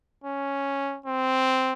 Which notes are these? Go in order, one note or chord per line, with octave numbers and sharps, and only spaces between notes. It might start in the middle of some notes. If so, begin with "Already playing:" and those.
C#4
C4